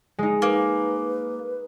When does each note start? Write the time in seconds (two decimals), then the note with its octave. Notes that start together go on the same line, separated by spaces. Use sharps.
0.19 G#3 D#4
0.42 A#3 B4